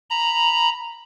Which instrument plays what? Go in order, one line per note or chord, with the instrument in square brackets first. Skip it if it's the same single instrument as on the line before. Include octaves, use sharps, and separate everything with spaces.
[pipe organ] A#5 B5